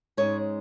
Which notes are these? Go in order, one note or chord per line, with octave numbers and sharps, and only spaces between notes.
G#2 G#3 C#4 C#5